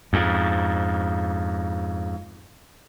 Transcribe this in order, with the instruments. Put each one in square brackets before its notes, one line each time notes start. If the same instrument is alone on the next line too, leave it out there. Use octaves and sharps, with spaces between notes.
[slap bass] F2 G#2